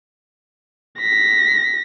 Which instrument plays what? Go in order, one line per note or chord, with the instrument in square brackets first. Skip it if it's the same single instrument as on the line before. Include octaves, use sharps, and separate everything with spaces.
[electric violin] A#6 B6